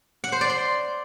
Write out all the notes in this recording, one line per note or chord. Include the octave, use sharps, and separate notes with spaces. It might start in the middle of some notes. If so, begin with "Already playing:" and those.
F#5
C5
D5
C6